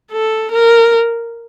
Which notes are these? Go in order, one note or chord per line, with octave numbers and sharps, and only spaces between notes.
A4
A#4